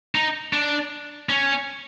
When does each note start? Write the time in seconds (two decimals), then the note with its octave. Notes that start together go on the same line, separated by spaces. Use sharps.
0.15 D#4
0.53 D4
1.29 C#4